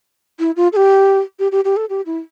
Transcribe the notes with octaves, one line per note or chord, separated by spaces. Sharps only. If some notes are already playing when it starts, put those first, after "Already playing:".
E4
F4
A4
G4
G4
G4
G4
A4
G4
E4